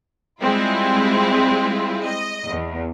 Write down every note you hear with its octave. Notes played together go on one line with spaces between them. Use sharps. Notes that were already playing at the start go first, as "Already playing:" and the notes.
G3 G#3 C4 E4 F4
D#5
E2